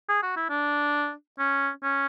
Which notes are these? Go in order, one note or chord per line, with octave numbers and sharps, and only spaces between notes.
G#4
F#4
E4
D4
C#4
C#4